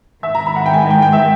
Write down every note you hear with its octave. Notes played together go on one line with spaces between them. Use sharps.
G#2 D#3 G#3 E5
A#5
B5
F#5
G5
G#5
G5
G5
E5